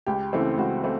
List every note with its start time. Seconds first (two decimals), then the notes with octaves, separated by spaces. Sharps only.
0.06 C#2 G4
0.33 C#3 E3 A3 C4
0.57 C#2 F#4
0.84 A3 C4